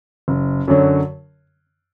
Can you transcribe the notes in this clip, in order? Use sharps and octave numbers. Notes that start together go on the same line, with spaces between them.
F#1
F#2 D3 F#3